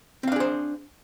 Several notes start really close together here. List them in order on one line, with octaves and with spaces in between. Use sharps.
C4 F5 D4 G#4 C5